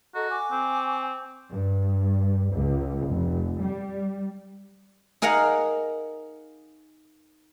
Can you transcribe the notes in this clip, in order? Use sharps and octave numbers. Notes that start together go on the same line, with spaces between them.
F#4 A4 D#5 A#5
G#5 C#6 D6
C4
G2
C#2
F1
G3
D#4 G#4 A#4 F5 F#5 A#5